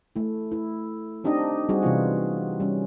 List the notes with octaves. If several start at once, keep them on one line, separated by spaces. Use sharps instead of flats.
A3 E4
E4
C4 D4 D#4 G4 D#5
G3 C4 F#4 G#4
C3 E3 B3 F4
G3 C#4